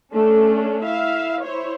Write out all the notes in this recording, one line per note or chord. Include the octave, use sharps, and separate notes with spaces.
A3 C#4 D4 A4
E4 E5 F5
E4 C5 C#5